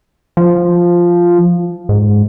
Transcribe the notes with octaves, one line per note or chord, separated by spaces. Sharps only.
F3
G#2